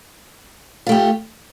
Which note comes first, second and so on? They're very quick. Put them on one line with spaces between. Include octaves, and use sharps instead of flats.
F4 A3 G4